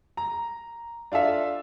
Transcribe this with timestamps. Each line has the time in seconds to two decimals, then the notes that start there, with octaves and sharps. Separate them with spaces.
0.17 A#5
1.12 D4 F4 A4 E5 F5